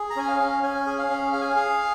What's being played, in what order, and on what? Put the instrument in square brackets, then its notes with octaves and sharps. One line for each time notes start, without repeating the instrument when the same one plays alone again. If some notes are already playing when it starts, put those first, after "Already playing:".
Already playing: [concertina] G#4
A#5
C#4 G#5
F5
C#4
C#4 G#5
G#4
F5
C#4
G#4 F5
G#5
F5
G#4